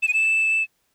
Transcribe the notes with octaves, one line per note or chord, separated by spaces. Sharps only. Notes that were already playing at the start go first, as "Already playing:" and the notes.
E7
D#7
E7